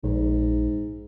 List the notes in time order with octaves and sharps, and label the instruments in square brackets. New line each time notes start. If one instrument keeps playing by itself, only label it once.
[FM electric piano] A#1 [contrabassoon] G#2